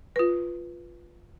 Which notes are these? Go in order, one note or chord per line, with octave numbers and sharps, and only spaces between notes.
F4 B4